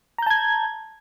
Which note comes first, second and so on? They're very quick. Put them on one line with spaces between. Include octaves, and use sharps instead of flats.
A#5 G6 A5 G#6